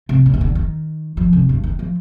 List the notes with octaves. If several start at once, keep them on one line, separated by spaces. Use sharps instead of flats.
C3
A#2
D#3
D3
D#3
F3
C3
G2
D#3
F3